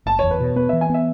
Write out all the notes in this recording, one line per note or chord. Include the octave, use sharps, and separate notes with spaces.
F#1 A5
E2 C#5
B4
B2
B3 B4
E3 E5
G#5
B3 E5